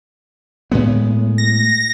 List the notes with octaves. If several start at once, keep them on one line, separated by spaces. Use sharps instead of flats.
A2 G#3 B3
A#6